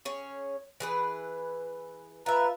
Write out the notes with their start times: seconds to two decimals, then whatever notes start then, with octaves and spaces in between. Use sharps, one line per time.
0.05 C#4 G#4 C#5
0.80 E3 G#4 B4
2.26 F4 B4 E5 A#5 F#6